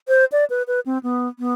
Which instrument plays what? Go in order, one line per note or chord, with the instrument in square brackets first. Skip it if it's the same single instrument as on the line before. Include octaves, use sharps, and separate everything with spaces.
[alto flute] C5
D5
B4
B4
C4
B3
B3